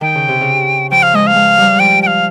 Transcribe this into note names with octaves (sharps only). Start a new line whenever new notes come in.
D#3 G5
C#3
C3
C#3
F3 G5
F5
G#3 D#5
F5
G#3
G3
F3 G5
G5
F5